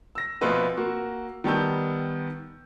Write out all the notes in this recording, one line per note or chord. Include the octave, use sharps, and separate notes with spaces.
E6 A#6
A#1 B2 C4 F4 B4 E6
A#3 F#4
D#3 G3 B3 A5 E6 G6